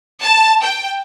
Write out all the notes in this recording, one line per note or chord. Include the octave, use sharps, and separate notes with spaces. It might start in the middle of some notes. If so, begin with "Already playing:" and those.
A5
G5